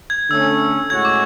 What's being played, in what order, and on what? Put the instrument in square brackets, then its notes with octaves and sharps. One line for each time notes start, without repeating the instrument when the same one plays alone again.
[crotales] G#6
[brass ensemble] D3 A3 C#4 [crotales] E6
[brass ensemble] A2 G#3 C#4 F#4 [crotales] G#6
[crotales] D6